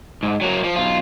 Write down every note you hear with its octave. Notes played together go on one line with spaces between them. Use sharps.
G#2
F#3 A#3
F3
B1 F4